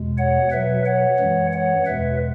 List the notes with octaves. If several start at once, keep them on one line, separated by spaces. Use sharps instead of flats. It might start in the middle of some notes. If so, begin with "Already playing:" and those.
Already playing: E2 B2 G#3
C#5 F#5
B2 F#3 B4 E5
C#5 F#5
F#2 E3 G#3
C#5 F#5
E2 B2 G#3 B4 E5